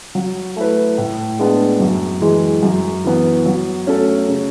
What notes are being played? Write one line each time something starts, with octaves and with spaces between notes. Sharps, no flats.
F#3
A3 E4 B4
A2
G#3 B3 D4
F#2
E3 G#3
F#2
E3 B3
F#3
A3 C#4 F#4 A4
C#3